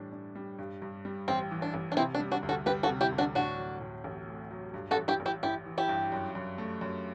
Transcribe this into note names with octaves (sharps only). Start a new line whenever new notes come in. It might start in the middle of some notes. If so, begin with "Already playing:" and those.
Already playing: A2 E3 G3 D4
D4
G3
G2
G2
G3
A1 C4
E3
D4
A1
D4
C3 C4 E4
D4
G3
D4 F#4
D2
F#4 A4
G3 G4 B4
F#4 A4
C3
E4 G4
D2
D4 F#4
A2 D4 F#4
F#3
A2
A1
A3
F#3
G2
F#4 A4
A1
E4 G4
A1
E4 G4
A1 E4 G4
E3
E4 G4
G2
F#2
F#2
A3
F#2